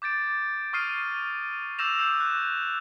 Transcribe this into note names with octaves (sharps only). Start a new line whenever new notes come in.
D6 G6 A6 D7
C#6 D#6 F6 C7 D#7
D6 E6 G6 A#6 E7 F7
E6 G6
F#6